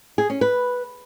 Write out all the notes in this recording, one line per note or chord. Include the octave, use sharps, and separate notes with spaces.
G#4
C#4
B4